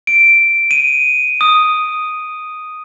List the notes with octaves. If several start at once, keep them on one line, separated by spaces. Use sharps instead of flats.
D7
D#7
D#6